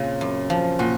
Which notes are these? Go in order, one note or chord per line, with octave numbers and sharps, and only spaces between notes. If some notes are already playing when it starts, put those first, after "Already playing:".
Already playing: A#2 C#3 C4
F#2
F3
A#2 F#4